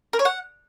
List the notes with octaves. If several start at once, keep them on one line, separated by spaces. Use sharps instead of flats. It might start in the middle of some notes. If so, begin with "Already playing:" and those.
A#4
C#5
F#5